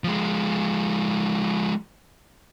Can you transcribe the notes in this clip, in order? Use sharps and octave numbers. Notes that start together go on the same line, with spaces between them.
F3 G#3